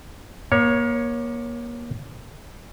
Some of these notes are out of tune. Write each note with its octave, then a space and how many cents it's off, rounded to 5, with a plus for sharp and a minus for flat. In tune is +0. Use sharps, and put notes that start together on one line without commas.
A#3 +30 C#5 +0